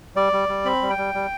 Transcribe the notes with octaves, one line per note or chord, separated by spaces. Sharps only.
G3 D5
G3
G3
C4 B5
G3
G5
G3
G3